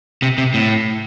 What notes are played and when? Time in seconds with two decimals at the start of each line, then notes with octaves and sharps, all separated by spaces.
0.22 C3
0.38 C3
0.54 A2